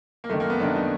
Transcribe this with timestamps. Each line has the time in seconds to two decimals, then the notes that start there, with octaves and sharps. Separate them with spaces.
0.24 A#3
0.30 F#2 D#3 A3
0.40 A#3
0.50 B3
0.60 F#2 D#3 D4
0.75 D#4